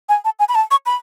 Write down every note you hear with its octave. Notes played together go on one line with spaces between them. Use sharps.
G#5
A5
G#5
B5
A5
C#6
B5